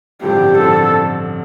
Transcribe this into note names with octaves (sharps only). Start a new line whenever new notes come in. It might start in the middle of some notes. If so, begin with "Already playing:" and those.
A1 G2 D3 F3 C4 G4
A1 G2 D3 F3 C4 A4